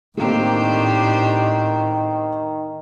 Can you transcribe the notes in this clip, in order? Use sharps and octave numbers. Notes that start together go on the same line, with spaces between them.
A2 D#3 A3 A#3 C4 D4 G4 C5